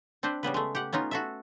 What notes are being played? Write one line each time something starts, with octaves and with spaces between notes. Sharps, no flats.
C4 D4 B4 C5
C#3 G3 B3 B4
G#3 A3
G4 F#5
B3 C#4 D#4 F4
F#4 A4 E5